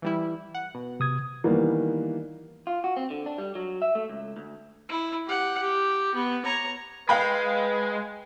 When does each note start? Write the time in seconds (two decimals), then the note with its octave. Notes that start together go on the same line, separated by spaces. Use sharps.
0.02 E3 G3 E4
0.54 F#5
0.74 B2
1.00 C3 D#6 G#6
1.44 D#3 E3 G3 A#3 B3
2.67 F4
2.84 F#4
2.97 C4
3.10 D3
3.26 D4
3.38 G3
3.55 F#3
3.82 E5
3.95 A3
4.10 C#2
4.36 D2
4.89 E4
5.27 G4 F#5
5.60 G4
6.15 B3
6.45 C#5 A#5
7.09 G#3 B4 F5 G5 B5